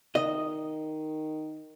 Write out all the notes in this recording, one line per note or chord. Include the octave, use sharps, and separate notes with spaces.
D#3 D#5